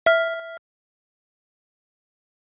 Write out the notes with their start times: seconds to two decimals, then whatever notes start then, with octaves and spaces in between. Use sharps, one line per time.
0.06 E5 F6